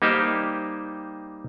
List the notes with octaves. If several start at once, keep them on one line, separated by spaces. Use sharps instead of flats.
G3 A#3 D#4 G4 C5